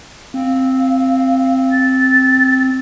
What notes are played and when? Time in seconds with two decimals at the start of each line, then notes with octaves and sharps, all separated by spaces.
0.34 C4 F5
1.71 A6